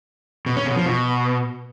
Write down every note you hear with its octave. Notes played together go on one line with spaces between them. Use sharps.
B2
C#4
B2
F3
B2